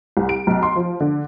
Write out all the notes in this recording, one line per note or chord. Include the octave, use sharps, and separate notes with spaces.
C2
D7
B1
C6
F3
D3